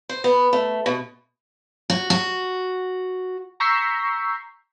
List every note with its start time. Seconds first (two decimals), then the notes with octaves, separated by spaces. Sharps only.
0.09 C5
0.24 B3
0.53 A3
0.86 B2
1.90 F#4
2.10 F#4
3.60 A#5 C#6 E6 G6 B6 C7